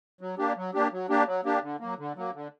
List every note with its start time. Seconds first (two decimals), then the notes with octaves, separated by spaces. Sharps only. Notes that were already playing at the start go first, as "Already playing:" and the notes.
0.21 F#3
0.38 A#3 D4 G4
0.57 F#3
0.74 A#3 D4 G4
0.92 F#3
1.09 A#3 D4 G4
1.27 F#3
1.44 A#3 D4 G4
1.62 D3
1.80 F#3 A#3
1.98 D3
2.16 F#3 A#3
2.34 D3